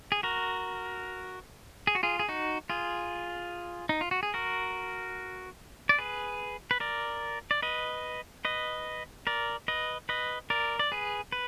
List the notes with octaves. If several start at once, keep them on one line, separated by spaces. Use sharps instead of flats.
G#4
F#4 A#4
G#4
F#4
F4 G#4
G#4
D#4 F#4
F4 G#4
D#4
F4
F#4
G#4
F#4 A#4
D5
G#4 B4
B4
A#4 D5
D5
B4 D#5
B4 D#5
A#4 D5
B4 D#5
B4 D#5
A#4 D5
D5
G#4 B4
B4